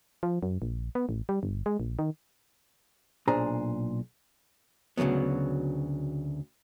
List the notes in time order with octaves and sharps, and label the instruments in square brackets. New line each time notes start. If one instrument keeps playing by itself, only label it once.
[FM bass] F3
F#2
A#1
B3
A1
G3
G1
G#3
A#1
D#3
[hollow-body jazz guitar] B1 A#2 D4 G#4 C5 A#5
D2 C#3 E3 F#3 B3